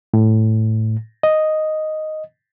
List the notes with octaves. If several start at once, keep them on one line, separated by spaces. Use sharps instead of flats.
A2
D#5